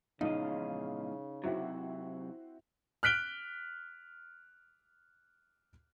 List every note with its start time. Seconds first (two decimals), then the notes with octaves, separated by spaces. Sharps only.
0.21 A#1 E2 G#2 C#3 D#4 D#5 F5
1.44 C3 F#3 C4 E4 F#4
3.03 F6 F#6 B6 D7 G7